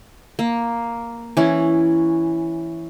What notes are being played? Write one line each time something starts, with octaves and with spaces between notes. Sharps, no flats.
A#3
E3 C#4